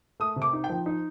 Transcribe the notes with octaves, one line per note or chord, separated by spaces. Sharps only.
A3 D#6
C3
D6
D#4
G5
F3
D#4